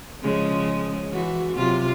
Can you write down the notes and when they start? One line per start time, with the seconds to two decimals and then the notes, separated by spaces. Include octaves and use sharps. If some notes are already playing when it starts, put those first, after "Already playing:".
0.22 C#3 F3 G#3
1.12 E3 F#4
1.55 C3 F#3 F4